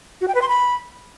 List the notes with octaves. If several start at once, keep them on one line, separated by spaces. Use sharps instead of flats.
F#4
G5
B4
C6
B5